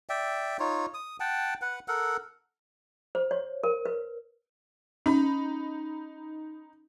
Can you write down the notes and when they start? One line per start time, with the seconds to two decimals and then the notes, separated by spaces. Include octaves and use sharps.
0.09 D5 E5 G5
0.59 D#4 F4 C#5
0.94 D#6
1.20 F#5 G5 A5
1.62 B4 F#5
1.88 A4 A#4 F#5
3.15 C5
3.31 C#5
3.64 A#4
3.86 B4
5.06 C#4 D#4 B5